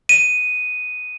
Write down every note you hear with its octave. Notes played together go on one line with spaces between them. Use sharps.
D#7